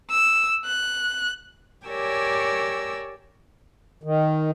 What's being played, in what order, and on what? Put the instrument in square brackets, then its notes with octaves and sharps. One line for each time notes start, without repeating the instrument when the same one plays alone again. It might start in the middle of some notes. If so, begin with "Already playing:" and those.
[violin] E6
F#6
[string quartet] G4 A#4 C#5 D5 G#5 E6
[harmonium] D#3